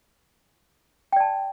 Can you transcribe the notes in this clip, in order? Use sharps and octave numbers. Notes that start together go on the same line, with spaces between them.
D5 G5 A5